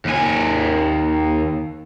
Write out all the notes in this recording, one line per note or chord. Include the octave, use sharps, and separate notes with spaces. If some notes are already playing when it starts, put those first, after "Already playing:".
D#2 G#5